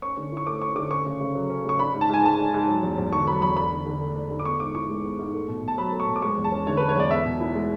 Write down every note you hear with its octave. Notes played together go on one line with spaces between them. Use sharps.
C#4 C#6
D3
E4 C#6
A3 D6
C#4 C#6
D3 D6
C#4 C#6
C#3
C#3
F#3
C#4
C#3 C#6
D4 B5
G#2
A5
G#2 G#5
G#3 A5
D4
G#2
F#3
E2
E2
D3 C#6
F#3 B5
E2 B5
D4 B5
D3
D3
A3
D4
D3
D6
B3 C#6
G#2 D6
E4 C#6
G#3
B3
G#2
A3
B2
B2 A5
F#3 B5
A3
C#6
B2
D6
G#3 C#6
E2
A5
C#4
D3 C#5
B4
G#3
C#5
E2 D5
B3 E5
B2
E4
G#3